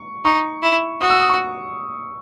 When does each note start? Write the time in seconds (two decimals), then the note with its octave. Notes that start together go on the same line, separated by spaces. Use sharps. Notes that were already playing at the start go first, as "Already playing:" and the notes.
Already playing: C#6
0.25 D#4 C#6
0.62 E4
1.01 F#4 D#6
1.10 E6
1.20 D#6
1.29 C#6